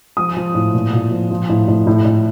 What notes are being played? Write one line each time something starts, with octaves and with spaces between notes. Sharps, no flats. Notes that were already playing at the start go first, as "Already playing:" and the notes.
F3 D#6
F3
A2
A#2
A#2
F3
F3
A2
A2
A2
A2